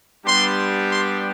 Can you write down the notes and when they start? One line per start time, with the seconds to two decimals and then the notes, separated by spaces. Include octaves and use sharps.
0.24 G3 B3 D4 G4 C6
0.89 C6